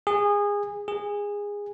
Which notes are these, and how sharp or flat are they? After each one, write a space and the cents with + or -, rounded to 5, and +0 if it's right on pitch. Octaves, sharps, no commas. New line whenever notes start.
G#4 -25
G#4 -20